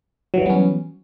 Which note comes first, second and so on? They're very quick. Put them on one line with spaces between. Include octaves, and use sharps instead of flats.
F#3 E3 G3 B3 C#4